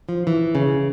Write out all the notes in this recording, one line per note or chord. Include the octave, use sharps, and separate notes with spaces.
F3
E3
C#3